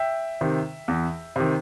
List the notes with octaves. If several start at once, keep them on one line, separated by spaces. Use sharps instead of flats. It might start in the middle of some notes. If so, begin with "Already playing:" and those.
Already playing: E5 G5
C3 D#3
E2
C3 D#3